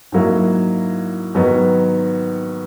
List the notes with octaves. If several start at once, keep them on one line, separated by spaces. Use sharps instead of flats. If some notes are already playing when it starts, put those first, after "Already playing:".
G#2 F#3 A#3 E4
G#2 D#3 F#3 B3